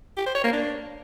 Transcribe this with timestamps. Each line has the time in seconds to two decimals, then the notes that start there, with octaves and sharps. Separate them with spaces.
0.17 G4
0.26 C5
0.35 C#5
0.44 A#3
0.53 D4